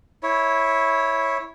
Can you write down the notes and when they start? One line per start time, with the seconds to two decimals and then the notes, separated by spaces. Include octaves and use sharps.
0.23 E4 C#5